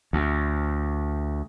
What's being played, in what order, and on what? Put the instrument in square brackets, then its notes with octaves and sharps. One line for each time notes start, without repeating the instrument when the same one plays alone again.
[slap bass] D2